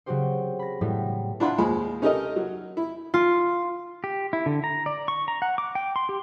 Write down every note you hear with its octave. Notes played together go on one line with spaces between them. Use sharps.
C#3 F#3 C4 F#4 G4 C5
B5 A#6
A2 F#3 G3 B3 E4
D4 E4 F4 F#5 B5
D#2 F3 G#3 B5
C#4 D#4 G4 A4 A#4 D#5
F#3
E4
F4
G4
E4
D3
A#5
D5
C#6
A#5
F#5
D6
G5
C6
G4